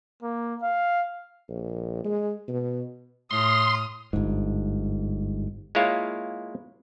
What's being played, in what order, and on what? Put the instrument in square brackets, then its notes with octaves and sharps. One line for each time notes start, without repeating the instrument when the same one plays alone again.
[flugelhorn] A#3
F5
[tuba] A#1
G#3
B2
[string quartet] A2 F6 [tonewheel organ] C6 [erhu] D#6
[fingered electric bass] G1 G#2
[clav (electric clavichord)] G#3 A#3 E4 F4 C#5 F5